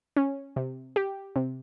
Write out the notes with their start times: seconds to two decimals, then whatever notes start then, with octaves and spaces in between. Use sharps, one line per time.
0.16 C#4
0.56 C3
0.96 G4
1.36 C3